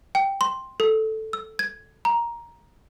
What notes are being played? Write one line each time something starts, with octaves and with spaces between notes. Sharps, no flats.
G5
C6
A4
E6
G#6
A#5